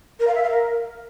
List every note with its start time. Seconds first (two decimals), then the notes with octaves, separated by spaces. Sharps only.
0.19 A#4
0.27 F5
0.35 E5
0.43 F5
0.51 A#4